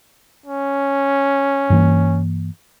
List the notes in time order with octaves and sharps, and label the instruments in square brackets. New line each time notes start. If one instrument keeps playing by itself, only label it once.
[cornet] C#4
[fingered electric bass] G2 E3 A#3